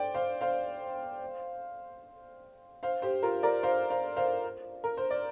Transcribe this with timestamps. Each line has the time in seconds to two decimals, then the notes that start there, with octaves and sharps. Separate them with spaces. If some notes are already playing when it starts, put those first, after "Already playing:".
Already playing: C5 D5 G5
0.14 C5 F5
0.41 C5 F5
2.83 C5 F5
3.02 G4 C5
3.23 F4 A#4
3.43 A#4 D5
3.63 C5 F5
3.90 C5 F5
4.16 C5 F5
4.84 A#4
4.97 C5
5.10 D5